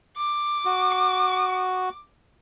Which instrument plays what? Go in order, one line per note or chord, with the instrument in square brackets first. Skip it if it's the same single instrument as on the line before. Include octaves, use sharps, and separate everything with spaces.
[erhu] D6
[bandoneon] F#4